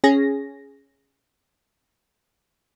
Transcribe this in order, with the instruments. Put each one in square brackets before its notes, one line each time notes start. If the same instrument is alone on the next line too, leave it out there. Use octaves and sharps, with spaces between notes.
[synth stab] C#4 G#4 A#6